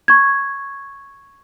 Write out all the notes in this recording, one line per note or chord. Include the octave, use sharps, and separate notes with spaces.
C#6 G#6